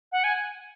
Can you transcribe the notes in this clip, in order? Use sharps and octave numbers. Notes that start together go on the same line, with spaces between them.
F#5
G#5